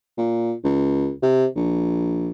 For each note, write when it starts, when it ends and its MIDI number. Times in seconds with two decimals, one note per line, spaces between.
0.18 0.54 46
0.64 1.12 37
1.22 1.46 48
1.56 2.31 34